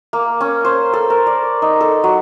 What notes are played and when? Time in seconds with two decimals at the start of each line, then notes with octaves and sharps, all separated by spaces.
0.13 A#3
0.41 C#4
0.65 C5
0.93 A4
1.10 A#4
1.27 D5
1.62 D#4
1.81 A4
2.04 F#3